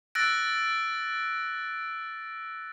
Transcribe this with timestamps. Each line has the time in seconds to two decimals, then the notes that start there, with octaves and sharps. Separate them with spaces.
0.15 E6 F#6 A6 A#6 D7